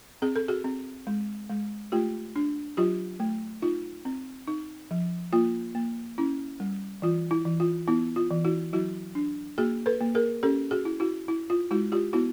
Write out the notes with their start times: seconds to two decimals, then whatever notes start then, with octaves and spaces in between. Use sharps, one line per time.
0.22 C4 G#4
0.36 A4
0.48 F#4 G#4
0.64 C4
1.07 G#3
1.50 G#3
1.92 A3 F4 G4
2.36 D4
2.77 F#3 F4 G4
3.20 A3
3.62 D#4 F4
4.05 C4
4.48 D#4
4.91 F3
5.33 A#3 F4
5.75 A#3
6.18 C#4 E4
6.60 G3
7.02 E3 F4
7.31 E4
7.45 E3
7.60 F4
7.88 B3 E4
8.16 F4
8.31 E3
8.44 E4 F#4
8.73 F#3 E4 F#4
9.15 D4
9.58 A#3 F#4 G#4
9.86 A4 B4
10.01 A#3
10.15 G#4 A#4
10.43 C#4 G4 A4
10.71 F#4 G#4
10.85 E4
11.00 E4 F#4
11.28 E4
11.50 F4
11.71 G#3 E4 F#4
11.92 F4 G4
12.13 B3 E4 F#4